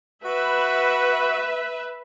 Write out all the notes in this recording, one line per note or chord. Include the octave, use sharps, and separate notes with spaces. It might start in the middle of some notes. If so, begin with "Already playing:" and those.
F#4 B4 E5